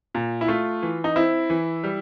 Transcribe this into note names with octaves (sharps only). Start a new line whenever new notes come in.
A#2
E4
A3 F4
E3
D#4
C4 E4
E3
G3